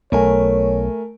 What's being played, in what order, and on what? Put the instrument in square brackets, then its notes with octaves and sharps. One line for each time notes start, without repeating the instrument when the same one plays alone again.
[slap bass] B1 [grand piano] A3 A#4 G#5 [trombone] C#5